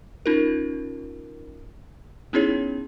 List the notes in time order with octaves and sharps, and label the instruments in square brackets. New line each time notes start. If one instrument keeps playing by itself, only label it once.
[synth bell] C#4 D#4 F4 A#4
B3 C#4 D#4 E4 G#4 C#5